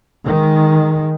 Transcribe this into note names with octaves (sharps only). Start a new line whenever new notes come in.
D#3 G#3